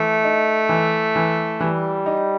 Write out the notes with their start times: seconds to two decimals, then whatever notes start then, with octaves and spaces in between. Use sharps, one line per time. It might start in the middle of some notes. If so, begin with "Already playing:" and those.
Already playing: E3 A3
0.24 D#4
0.69 E3
1.16 E3
1.60 E3 G3
2.06 D#4